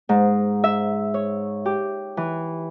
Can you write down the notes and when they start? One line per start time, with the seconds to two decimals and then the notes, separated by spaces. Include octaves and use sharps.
0.09 G#2
0.64 E5
1.14 C#5
1.66 G4
2.17 E3